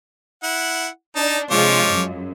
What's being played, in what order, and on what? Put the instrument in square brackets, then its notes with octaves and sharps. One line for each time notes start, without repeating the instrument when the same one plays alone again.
[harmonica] E4 F#5
[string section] D4 [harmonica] D#4 A5
[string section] C3 G#3 F4 [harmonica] F3 C#5 D6
[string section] F#2